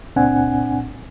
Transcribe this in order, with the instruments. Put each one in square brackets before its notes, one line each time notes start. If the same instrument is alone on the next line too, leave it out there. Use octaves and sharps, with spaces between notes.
[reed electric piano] C#2 A#2 C4 D4 F#5 G#5